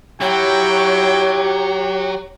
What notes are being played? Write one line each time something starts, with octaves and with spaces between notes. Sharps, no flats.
F#3 E4 F#4 G4 C#5 G5